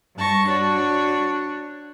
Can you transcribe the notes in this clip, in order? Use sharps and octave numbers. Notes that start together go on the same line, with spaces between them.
G2 A5 C#6 A#6
D4 F#4 C#5